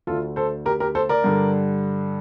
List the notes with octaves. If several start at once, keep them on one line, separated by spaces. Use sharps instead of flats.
D2 D3 A3 F4 A4
A4 C5
G4 A#4
G4 A#4
A4 C5
A#4 D5
G2 D3 G3